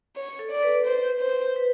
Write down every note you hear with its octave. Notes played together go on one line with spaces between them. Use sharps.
C#5
A4
D5
B4
C5
C5
B4